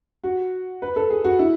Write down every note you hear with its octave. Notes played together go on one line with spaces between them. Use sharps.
F#4
B4
A4
G#4
F#4
E4